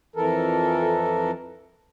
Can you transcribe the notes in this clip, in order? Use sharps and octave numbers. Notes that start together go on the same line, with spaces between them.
F2 E3 A4 A#4